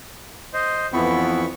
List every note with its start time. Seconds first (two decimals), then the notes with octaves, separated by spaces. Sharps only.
0.53 C5 D#5
0.93 F2 E3 B3 E4 B5 C#6